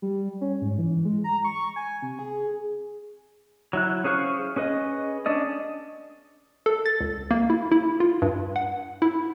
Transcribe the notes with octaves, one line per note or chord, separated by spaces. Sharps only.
G3
C#4
G#2
E3
G#3
A#5
C#6
G#5
C3
G#4
F#3 E4 F#6
C#4 G#4 C5 F5 C#6
C#4 G#4 B4 D#5
C#4 D4 D5 D#5
A4
A6
C#2
A#3
E4
E4
F4
G2
F#5
E4